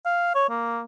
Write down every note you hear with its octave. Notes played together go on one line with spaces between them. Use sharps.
F5
C#5
A#3